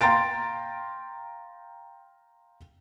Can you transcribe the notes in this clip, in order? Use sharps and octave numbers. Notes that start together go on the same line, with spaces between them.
F5 G5 A#5 C6 A6 D7